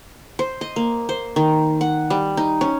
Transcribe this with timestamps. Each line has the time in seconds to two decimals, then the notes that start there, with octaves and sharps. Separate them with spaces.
0.39 C5
0.61 D#5
0.76 A#3
1.09 C5
1.36 D#3
1.81 F#5
2.10 G3
2.37 D#4
2.61 C#4